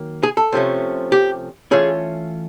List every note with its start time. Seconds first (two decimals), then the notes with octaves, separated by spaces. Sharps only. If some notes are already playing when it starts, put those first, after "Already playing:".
Already playing: D#3 F#3 A#3
0.23 G#4
0.37 A4
0.52 C3 F3 A3 C#4
1.12 G4
1.71 E3 A3 C#4 F4 G#4